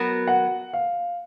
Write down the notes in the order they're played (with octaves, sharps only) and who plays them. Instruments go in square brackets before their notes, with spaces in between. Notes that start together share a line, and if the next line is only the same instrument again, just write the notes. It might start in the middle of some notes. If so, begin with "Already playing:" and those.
Already playing: [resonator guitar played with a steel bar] F#3 B3 F#4 A#4
[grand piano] F#5
F5